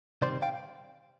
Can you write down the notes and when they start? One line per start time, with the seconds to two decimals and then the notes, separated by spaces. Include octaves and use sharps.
0.22 C3 D#3 G3 C4 C5 D5
0.42 F5 G5